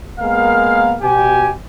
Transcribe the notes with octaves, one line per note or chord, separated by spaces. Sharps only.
G#3 A#3 B3 A#4 F5
B2 G4 G#5